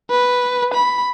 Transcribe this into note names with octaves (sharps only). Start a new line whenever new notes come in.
B4
B5